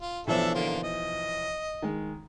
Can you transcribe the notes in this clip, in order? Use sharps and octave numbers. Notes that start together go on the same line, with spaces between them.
F4
B1 E3 F3 D4 A4 E5
D3 A#3 F4
D#5
D#3 G#3